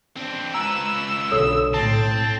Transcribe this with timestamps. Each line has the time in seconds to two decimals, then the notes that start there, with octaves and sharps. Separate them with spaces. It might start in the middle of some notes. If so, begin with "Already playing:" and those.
0.17 C4 D4
0.54 C#2 B4 A#5 E6
1.32 B1 D3 A4 C#5 D#6
1.74 A2 C4 A5